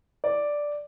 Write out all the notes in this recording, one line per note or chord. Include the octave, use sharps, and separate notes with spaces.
D5